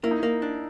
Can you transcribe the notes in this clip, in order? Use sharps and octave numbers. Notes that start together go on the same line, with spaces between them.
A#3 E4
D#4
A#3 E4
D4